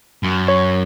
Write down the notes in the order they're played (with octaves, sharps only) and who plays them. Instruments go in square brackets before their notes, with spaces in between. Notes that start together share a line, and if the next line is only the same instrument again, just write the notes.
[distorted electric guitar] F#2
[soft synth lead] C#5